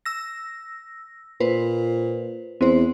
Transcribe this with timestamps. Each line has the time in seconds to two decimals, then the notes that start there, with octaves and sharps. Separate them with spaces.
0.06 E6 A#6
1.40 A#2 B4 C5
2.61 E2 C4 C5